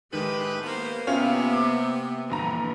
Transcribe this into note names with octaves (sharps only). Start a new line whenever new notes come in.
A2 D#3 G#3 G4 B4
A#3 B3 C5
C3 A#3 B3 C#4 F4 F5
D6
F1 G2 A#2 D3 E3 A#5